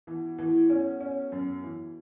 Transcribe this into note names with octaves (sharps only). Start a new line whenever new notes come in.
B2 E3
A2 E3
B2 C#4
C#4
F#2
E3